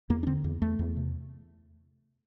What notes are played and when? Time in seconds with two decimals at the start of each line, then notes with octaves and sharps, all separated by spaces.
0.10 E2 A#3
0.23 D4
0.27 D3 C4
0.44 E2
0.62 E2 A3
0.79 E2
0.97 C3